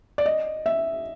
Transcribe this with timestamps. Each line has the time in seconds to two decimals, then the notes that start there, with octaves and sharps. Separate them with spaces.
0.18 D5
0.26 D#5
0.66 E5